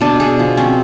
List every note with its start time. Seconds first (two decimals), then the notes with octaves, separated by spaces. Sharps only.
0.01 B2 D4
0.20 B2 G#4
0.39 F3
0.57 C4 C#4